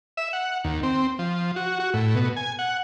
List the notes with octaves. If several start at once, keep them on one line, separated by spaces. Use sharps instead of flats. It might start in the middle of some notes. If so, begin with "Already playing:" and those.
E5
F#5
D#2
C4
F3
F#4
F#4
A2
B2
G#5
F#5